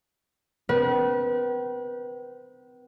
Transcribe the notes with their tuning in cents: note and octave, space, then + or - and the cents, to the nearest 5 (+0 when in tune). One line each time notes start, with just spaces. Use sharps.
C4 -45 B4 -35